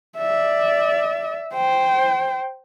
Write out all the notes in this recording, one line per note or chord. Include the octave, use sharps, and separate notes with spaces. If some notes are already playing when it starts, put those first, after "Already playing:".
D5 E5
C5 G5